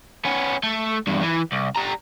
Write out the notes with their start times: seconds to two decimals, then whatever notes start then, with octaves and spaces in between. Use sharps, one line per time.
0.25 B3 C#4
0.63 A3
1.07 E2 G2
1.23 E3
1.52 C2
1.76 G3 A#5